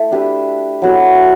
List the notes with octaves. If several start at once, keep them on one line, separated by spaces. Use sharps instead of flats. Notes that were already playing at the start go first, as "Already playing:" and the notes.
Already playing: A3 E4
D4 G4 B4 E5
F#3 B3 E4 A4